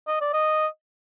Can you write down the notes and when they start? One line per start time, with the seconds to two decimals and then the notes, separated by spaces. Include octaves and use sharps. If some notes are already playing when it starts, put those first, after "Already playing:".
0.08 D#5
0.21 D5
0.33 D#5